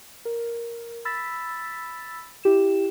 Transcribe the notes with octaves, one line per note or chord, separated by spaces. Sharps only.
A#4
B5 E6 A6 B6
E4 G4 E7